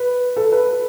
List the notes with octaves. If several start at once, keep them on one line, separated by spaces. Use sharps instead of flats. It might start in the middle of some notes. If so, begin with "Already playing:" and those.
Already playing: B4
A4
B4